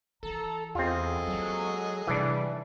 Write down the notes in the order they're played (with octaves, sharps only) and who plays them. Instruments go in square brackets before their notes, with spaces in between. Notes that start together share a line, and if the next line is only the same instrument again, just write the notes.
[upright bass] E3 [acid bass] A4 [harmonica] A#5
[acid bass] E2 [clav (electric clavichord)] C4 F4 [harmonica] G#4 A4 D#5
[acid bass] F#3 [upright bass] A#3
[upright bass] C3 [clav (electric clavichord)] E3 D4 [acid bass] G3